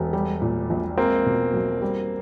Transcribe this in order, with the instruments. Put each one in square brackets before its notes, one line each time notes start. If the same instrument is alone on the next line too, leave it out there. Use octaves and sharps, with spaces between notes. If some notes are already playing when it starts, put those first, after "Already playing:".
Already playing: [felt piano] E1 [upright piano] A3 B3
[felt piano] G3
A#2
A#1
[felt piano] G#3 [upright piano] A#3 C4
[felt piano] B2
B1
G3